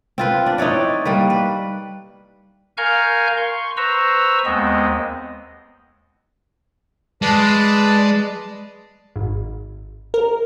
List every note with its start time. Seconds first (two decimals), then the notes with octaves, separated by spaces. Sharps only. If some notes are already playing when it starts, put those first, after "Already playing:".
0.18 C4 F4 B4
0.46 D4
0.58 D#4 E4 C#5 D5
1.05 G3 A#3 B4
1.30 B4
2.78 A#4 F5 G#5 C#6 F6 G6
3.37 C6 C#6
3.77 B4 C5 A#5 C#6 E6
4.46 D#2 G#3 B3 C4 D#5
7.22 G#3 B4 D5 A5
9.16 G#1
10.14 A#4